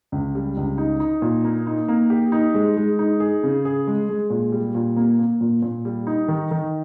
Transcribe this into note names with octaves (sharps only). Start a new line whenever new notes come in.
C#2
G3
C#2
D#4
D#4
A#2
A#3
D#4
A#3
G4
D#4
G#3
G#3
D#4
G#4
C#3
G#4
G#3
G#3
A#2
G3
A#2
A#3
A#3
A#2
A#2
G3
D#4
D#3
D#3